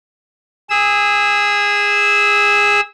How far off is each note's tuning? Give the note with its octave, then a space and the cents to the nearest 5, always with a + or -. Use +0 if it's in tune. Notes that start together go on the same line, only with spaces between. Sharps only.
G#4 -20 E6 -25